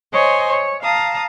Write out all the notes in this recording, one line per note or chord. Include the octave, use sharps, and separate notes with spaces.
C5 C#5 D#5 G#5 C6
C#5
F5 A5 A#5 D#6